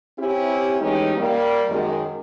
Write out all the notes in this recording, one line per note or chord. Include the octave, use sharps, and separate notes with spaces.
C4 C#4 E4 G4
E3 G#3 A3 C#4 D#4 G4
G3 A#3
F#2 D#3 G#3